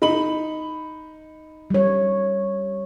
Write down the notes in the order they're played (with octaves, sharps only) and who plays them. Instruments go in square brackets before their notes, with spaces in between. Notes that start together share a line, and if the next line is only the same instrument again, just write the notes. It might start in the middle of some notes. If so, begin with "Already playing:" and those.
[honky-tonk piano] D#4 B5 F#7
[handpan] G3 C#5